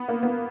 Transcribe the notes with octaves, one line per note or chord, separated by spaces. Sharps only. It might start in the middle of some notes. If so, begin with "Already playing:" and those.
Already playing: B3
A#3
B3